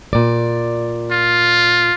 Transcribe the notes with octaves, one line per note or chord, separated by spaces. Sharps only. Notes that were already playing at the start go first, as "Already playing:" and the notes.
A#2 D5
F4